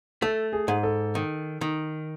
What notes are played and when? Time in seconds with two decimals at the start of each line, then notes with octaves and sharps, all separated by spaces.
0.22 A3 A4
0.53 G#4
0.68 G#2
0.83 A4
1.15 D#3
1.61 D#3